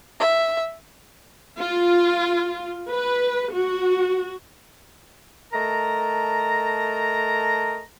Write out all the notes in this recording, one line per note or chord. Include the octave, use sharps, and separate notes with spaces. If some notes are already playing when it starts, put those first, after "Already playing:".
E5
F4
B4
F#4
A3 A#4 D#5 A5 A#5